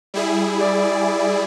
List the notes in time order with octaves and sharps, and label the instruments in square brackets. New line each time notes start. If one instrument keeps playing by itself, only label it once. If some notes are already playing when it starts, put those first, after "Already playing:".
[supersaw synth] G3 E4 G#4
[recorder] D5